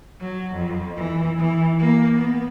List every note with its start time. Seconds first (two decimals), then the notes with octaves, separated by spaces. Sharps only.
0.20 F#3
0.55 F2
0.96 E3
1.38 E3
1.79 A#3
2.17 B3